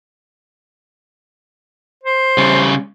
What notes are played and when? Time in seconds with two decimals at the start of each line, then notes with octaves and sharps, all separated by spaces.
2.04 C5
2.38 C#3 G3